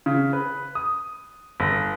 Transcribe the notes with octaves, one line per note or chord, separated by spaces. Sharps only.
C#3
B4
D#6
G1